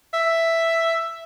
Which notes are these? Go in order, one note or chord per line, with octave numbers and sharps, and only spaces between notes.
E5